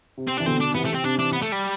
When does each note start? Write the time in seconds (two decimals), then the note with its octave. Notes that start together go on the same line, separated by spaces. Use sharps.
0.17 C3
0.27 C4
0.37 E3 D4
0.46 B2 D3 C4
0.60 B2 D4
0.74 C3 E3 B3
0.85 A3
0.90 C3 C4
1.04 C3 D4
1.18 C3 E3 D4
1.33 B3
1.42 A3
1.52 G3